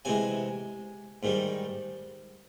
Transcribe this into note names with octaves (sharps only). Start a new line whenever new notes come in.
C3 E3 G#3 G#5
G#2 D#3 G3